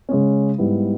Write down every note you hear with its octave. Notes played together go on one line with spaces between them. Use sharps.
C#3 G#3 C#4
G#2 G3 B3 E4